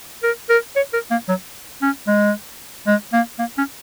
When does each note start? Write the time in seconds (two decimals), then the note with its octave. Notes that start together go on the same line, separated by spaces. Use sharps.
0.23 A#4
0.50 A#4
0.76 C#5
0.93 A#4
1.11 A#3
1.28 F#3
1.82 C#4
2.07 G#3
2.87 G#3
3.13 A#3
3.39 A#3
3.58 C#4